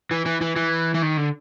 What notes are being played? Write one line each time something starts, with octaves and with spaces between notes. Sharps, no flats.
E3
E3
E3
E3
E3
D#3
D3